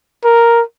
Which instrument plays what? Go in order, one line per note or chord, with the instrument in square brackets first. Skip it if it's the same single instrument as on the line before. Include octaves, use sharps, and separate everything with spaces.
[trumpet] A#4